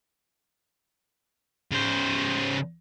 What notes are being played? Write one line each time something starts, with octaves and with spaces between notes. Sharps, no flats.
C#3 C5